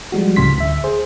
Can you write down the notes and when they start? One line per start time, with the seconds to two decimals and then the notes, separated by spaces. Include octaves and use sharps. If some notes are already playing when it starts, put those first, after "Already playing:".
0.12 F3 G3 G#3 F#4
0.36 C#2 A2 C#3 C6 B6
0.58 D2 E5
0.84 G#4 C5